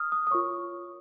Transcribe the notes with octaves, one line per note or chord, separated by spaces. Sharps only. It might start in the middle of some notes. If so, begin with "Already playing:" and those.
Already playing: D#6 F6
D#6
D#6
F4 A#4 C#5 C#6